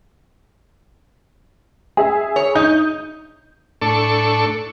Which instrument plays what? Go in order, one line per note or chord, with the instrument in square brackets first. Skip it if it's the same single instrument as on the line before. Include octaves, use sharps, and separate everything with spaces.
[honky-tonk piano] G#4 E5
[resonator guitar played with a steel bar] C#5
[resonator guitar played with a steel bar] D#4 [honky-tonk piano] G6
[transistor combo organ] A2 D4 A4 C#6